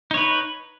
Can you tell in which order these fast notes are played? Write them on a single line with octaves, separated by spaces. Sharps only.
D#4 C#5 B4